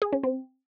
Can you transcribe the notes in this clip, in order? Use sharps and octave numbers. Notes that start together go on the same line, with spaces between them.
G#4
C#4
C4